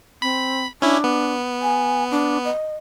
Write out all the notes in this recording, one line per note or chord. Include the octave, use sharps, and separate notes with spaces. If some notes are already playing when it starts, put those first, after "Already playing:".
C4 B5
C#4 D4 E4
B3
G#5
D4
D#5